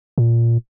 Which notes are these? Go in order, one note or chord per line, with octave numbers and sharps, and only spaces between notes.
A#2